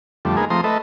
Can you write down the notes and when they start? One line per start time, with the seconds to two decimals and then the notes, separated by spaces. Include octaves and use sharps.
0.25 F2 D3 G3 A3
0.37 G#3 A#3 B3 D#4 G#4
0.50 F3 A3 C4 A#5 C6 D#6
0.64 A3 A4 B4 D#5 E5